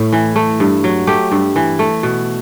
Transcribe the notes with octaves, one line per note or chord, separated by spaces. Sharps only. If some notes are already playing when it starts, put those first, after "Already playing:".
Already playing: A2 A3
E3
A3
G2
F#3
A3 G4
G2
E3
A3
B2